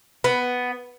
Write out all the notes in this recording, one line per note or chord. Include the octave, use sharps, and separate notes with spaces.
B3